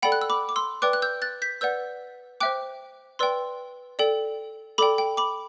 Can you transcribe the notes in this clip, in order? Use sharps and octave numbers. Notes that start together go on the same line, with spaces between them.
A4 D5 F#5 G5 B5
F#6
E6
B5 D6
D6
C6 E6
B4 D5 G5 D6 F#6
F#6
E6 G6
F#6 A6
G6 B6
B4 D5 F#5 E6 G6
C5 E5 G5 D6 F#6
B4 D5 G5 C6 E6
A4 D5 G5
A4 D5 G5 B5 D6
G5
B5 D6